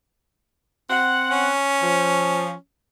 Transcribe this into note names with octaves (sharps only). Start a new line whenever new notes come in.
C4 F#5
C#4
F3